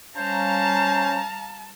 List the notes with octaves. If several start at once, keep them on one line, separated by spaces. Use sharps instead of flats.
G3 C#4 C5 F5 A5 A#5